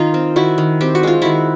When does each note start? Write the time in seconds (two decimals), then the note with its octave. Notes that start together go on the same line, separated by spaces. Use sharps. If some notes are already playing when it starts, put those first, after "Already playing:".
Already playing: D#3 D#4 F4
0.14 C4
0.36 D#3 E4 F#4
0.58 D#3
0.81 C4 G4
0.95 F#4
1.03 G#3 F4
1.22 D#3 E4 F#4